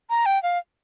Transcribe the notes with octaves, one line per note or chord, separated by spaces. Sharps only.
A#5
G5
F5